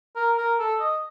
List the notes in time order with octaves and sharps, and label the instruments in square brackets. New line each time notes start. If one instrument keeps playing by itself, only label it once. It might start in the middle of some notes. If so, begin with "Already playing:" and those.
[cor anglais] A#4
A#4
A4
D#5